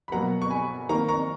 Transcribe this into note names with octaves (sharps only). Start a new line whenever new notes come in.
B5
B2 F#3 A#3 F#5 A#5
C#6
G#5 B5
D#3 A#3 A#5 C#6
A#5 C#6